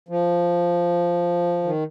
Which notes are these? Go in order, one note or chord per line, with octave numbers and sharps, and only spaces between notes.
F3
D#3